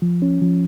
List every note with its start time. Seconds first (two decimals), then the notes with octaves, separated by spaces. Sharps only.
0.02 F3
0.22 C#4
0.41 F3